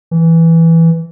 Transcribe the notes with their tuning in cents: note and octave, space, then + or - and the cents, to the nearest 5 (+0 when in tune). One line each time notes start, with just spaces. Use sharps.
E3 +0